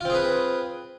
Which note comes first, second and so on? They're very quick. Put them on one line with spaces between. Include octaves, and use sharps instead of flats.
F4 C4 G#4 B4